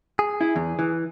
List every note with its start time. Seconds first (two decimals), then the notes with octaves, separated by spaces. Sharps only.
0.19 G#4
0.41 E4
0.56 E2
0.79 E3